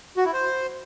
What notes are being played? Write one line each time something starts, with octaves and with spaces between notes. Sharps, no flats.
F#4
E4
C5